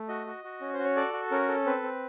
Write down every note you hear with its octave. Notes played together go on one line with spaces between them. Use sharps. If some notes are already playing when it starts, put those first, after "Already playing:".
Already playing: A3
F#4 D#5
F#4
F#4
C#4
C5
F#4
C#5
A4 D5
F#4
C#4 A#4
A4
C4 B4
C4